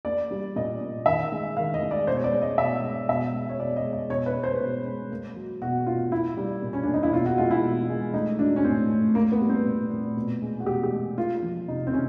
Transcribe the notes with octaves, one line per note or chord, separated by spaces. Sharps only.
A#3 D5
G3
A#2 D#5
A#2
D#3 E5
G#3
D#3 F5
D#5
G#3
D5
B2 C5
C#5
D5
G#3
D#5
B2 E5
G#3
B2 E5
G#3
C#5
B2 D5
D#5
G#3
D#5
B2 C#5
B4
G#3
C5
B2
G#3
A#3
F#3
B2 F#4
B2 F4
A#3 E4
G3
A#2
C#4
A#2 D4
D#4
E4
B2 F4
F#4
G#3 F4
E4
B2
G#3
A3 D#4
F#3 D4
C#4
A2 C4
A2
A#3
B3
G3
C4
A#2
A#2
B2
G#3
F#4
B2 G4
G4
G#3
A#3 F4
F3
C3 D#4
C4
C3 C#4